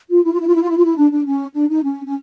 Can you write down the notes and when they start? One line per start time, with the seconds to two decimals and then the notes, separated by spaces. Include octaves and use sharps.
0.11 F4
0.25 E4
0.32 F4
0.39 E4
0.47 F4
0.55 E4
0.62 F4
0.69 E4
0.77 F4
0.85 E4
0.97 D4
1.11 D4
1.26 C#4
1.54 D4
1.69 D#4
1.83 C#4
2.06 C#4